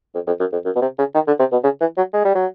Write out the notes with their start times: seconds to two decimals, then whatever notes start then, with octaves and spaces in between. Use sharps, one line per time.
0.15 F2
0.27 F2
0.40 F#2
0.52 F2
0.65 F#2
0.76 B2
0.82 C3
0.98 C#3
1.14 D#3
1.27 D3
1.39 C3
1.52 B2
1.64 C#3
1.81 E3
1.97 F#3
2.14 G#3
2.25 G3
2.35 F#3